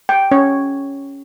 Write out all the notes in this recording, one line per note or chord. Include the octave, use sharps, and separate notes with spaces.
G5
C#4 C#5